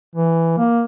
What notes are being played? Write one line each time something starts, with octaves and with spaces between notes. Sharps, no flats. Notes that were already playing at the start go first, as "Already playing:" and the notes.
E3
A#3